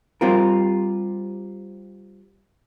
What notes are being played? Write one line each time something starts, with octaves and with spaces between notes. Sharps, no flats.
G3 C4 F4 A#4